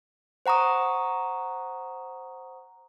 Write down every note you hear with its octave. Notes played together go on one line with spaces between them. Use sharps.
C5 F#5 A#5 C#6 D#6